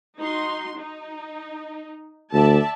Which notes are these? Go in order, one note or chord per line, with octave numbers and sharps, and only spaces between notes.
D#4 F#4 C6
D#4
D2 D5 E5 A5